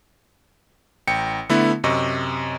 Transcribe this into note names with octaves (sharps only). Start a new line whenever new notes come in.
A1 G5 C#7
D3 A3 B3 E4
F#2 C3 D#5 C#6